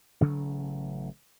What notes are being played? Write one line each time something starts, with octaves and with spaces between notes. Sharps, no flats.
A1 C#3 F#3 A3